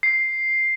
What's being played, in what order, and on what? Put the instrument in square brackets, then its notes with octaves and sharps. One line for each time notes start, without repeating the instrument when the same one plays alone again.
[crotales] C7